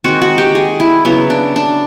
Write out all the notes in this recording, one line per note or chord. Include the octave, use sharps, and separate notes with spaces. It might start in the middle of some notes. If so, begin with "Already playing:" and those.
D#3 G#3 C4 F#4
F#4
G4
G#4
E4
C#3 F#3 B3 E4
D4
D4